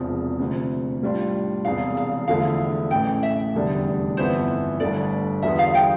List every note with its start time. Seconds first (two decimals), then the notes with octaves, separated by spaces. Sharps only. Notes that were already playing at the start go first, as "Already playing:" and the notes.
Already playing: E1 E2 C3 F3
0.39 D2 C3 F3
1.02 A2 G3 D4 F4
1.65 E1 E2 C3 F5
1.97 F5
2.28 E2 D3 F3 A3 E4 F5
2.91 A1 A2 E3 G5
3.23 E5
3.54 F1 E2 D3 G3 D4
4.17 G1 F2 E3 B3 E4 C5
4.80 G1 G2 D3 A3 D5
5.42 E2 D3 G3 B3 F4 E5
5.59 F5
5.75 G5